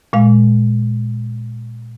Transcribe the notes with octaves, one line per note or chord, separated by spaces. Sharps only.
A#2 G#3 F5